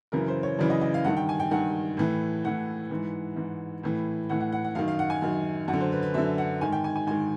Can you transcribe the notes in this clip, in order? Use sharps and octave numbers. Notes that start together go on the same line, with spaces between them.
F#2 C#3 E3 A#4
C5
C#5
F#2 C#3 E3 D5
D#5
D#5
F5
G2 D#3 F#5
G5
G#5
G5
G2 D#3 F#5
A2 E3
A2 E3 F#5
G#2 E3
G#2 E3
A2 E3
A2 E3 F#5
F#5
F#5
F#5
F#2 D#3 F5
F5
F#5
G#5
F#2 D#3
F#2 F#5
D3
C5
B4
B4
F#2 D3 E5
F#5
G#2 D#3 G#5
G5
G#5
G#5
G#2 D#3 G#5